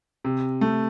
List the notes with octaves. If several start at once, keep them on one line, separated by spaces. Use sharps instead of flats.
C3
A3